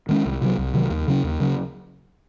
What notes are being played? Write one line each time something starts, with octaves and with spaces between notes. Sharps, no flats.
D#3 G#3 C#4
C2
C3 D#3 F#3
C2
C3 D#3 F#3
D#2
C#3 F#3 C#4
D#2
C#3 F#3 C#4